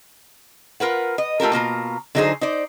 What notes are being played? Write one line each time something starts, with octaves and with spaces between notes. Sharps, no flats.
F4 A#4 B4 F#5
D#5
A3 F4 G4 A4 A#4
B2 A#3 F4 A#5
D3 F#3 D#4 F#4 G#4 C5
D#4 C5 D5